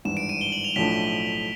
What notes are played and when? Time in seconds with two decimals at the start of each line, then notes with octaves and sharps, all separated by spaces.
0.05 G#1 G2 E3 E7
0.17 D7
0.29 D#7
0.41 G7
0.52 F#7
0.64 F7
0.76 B1 A2 F3 A3 D4 B6